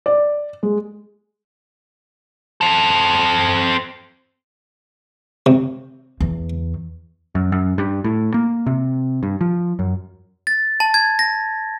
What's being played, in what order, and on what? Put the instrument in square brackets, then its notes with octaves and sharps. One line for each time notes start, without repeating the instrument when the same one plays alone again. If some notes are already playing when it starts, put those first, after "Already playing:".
[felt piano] D5
G#3
[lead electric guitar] C4 A4
[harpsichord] C3
[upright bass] E2
[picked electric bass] F#2
F#2
G2
A2
A#3
C3
G2
F3
F#2
[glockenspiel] A6
A5
G#6
A#6